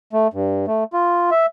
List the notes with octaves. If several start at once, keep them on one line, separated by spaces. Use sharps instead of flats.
A3
G2
A3
F4
E5